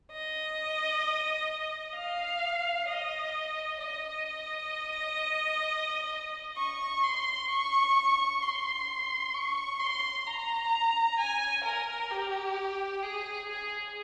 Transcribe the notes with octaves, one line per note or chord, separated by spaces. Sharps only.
D#5
F5
D#5
D#5
C#6
C6
C#6
C6
C#6
C6
A#5
G#5
A#4
G4
G#4
G#4